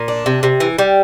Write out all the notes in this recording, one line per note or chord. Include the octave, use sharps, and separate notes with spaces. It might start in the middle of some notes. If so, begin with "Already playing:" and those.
Already playing: A#2
D4
C3
C3
E3
G3